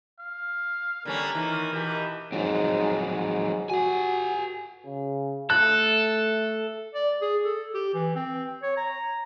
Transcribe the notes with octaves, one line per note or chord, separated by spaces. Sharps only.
F5
D3 G3 A#3 C#4 A#4
D#3 E3
B2 E3 G4
G#2 F3 F#3 C4
G#2
F#4 G4 G#5
C#3
A3 A4 F#6
D5
G#4
A4
G4
E3
C4
C#5
A#5